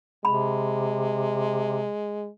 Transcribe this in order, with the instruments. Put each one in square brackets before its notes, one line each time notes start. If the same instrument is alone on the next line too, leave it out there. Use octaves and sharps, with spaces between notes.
[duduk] C3 [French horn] G#3 [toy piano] B5